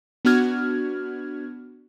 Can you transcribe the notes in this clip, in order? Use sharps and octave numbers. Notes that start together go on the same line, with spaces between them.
B3 D4 F#4 F6 G#6